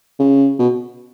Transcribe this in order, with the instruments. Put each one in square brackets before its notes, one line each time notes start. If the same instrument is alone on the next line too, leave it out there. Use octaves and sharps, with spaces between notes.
[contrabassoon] C#3
B2